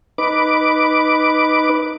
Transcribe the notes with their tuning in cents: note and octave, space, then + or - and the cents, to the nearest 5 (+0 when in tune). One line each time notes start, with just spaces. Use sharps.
D#4 +0 B4 +0 D6 +0